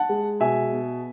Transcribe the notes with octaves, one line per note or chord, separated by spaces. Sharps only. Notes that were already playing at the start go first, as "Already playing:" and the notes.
Already playing: F#5 A5
G#3
B2 E5 G#5
B3